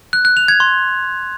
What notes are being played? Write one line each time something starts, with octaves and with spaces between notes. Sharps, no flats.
F#6
F#6
F7
G#6
C6